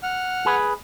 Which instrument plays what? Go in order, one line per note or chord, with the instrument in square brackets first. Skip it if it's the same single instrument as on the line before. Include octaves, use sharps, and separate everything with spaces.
[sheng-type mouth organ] F#5 F6
[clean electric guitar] G#4 B4